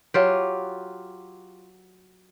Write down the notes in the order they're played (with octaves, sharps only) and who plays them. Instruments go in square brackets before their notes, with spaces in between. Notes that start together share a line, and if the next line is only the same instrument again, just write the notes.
[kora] F#3 F4 G4